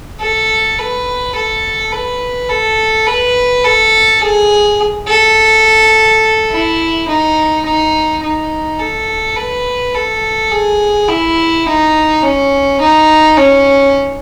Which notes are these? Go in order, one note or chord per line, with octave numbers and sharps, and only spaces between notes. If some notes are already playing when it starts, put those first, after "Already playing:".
A4
B4
A4
B4
A4
B4
A4
G#4
A4
E4
D#4
D#4
D#4
A4
B4
A4
G#4
E4
D#4
C#4
D#4
C#4